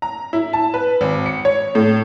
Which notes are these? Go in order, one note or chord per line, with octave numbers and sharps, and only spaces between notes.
A#5
E4
A5
B4
G#1
C#7
C#5
A2